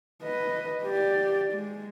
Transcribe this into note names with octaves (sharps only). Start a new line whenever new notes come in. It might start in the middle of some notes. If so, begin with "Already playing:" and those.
B4 D#5
G4 D5
G#3